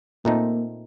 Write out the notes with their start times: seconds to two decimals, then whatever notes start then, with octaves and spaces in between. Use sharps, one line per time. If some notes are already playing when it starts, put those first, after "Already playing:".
0.25 A#2 A3 A#3 C4 D#4 A4